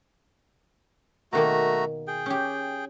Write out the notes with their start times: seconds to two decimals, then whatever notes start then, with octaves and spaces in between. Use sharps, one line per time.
1.33 B2 D#3 A3 A#3 F#4 A#5
2.07 G#4 G5
2.26 C#4 G4